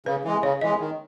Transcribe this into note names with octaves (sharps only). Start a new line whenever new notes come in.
C#3 B4
E3 G#3
C#3 C#5
E3 G#3 D#5
D#3